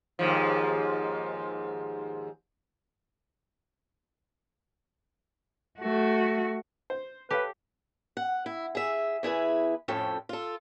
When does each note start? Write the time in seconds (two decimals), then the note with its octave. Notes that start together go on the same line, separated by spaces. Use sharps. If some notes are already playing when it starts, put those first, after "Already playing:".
0.19 D#2 G#2 F3
5.79 A3 F#4
6.90 C5
7.31 G4 A4 B4 C#5 F5
8.17 F#5
8.46 E4
8.75 G#4 E5
9.23 E2 E4 G#4 B4
9.88 F2 A2 F3 C#4 A4 G5
10.29 F4 A4